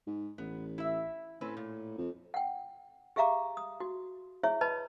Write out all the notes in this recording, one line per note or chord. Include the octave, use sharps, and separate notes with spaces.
G#2
A1 B3
E4 E5
A2 C4 C#4 B4
A#2
F2
F#5 G5
G4 G#4 E5 F5 A#5 D6
D#6
F#4
E4 G#4 C#5 E5
B4 D#5 A5 B5